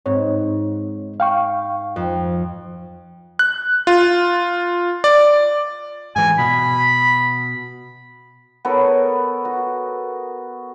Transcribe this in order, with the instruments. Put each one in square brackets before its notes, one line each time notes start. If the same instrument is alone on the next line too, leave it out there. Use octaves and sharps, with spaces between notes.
[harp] G#2 [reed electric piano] C4 C#5
[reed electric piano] F5 G5 C#6
[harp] F2
[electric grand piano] F#6
F4
D5
[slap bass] G#2 E3 [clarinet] G#5
[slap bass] B2 [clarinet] B5
[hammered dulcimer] B3 A4 A#4 C#5
F#4